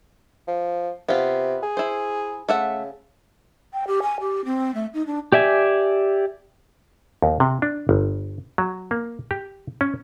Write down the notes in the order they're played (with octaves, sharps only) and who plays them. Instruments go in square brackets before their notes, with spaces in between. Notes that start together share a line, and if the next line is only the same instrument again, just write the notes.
[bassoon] F3
[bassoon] C3 [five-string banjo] B3 F4
[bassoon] G#4
[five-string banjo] E4 C5
[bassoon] C#3 [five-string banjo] A3 E5 F#5
[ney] G5
G4
G#5
G4
C4
A3
D#4
D4
[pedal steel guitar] G4 D5 E5 G#5
[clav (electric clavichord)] D#2
C3
D4
G1
F#3
A#3
G4
C#4